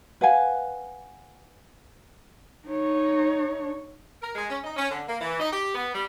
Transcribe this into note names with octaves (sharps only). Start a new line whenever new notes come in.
B4 F5 F#5 G#5
D#4 C#5
A#4
G#3
C#4
D#4
C#4
D3
A#3
E3
D#4
G4
B3
G3